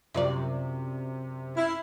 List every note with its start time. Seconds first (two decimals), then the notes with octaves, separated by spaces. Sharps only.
0.14 F#2 C3 F4 D5
1.57 E4 F6 C7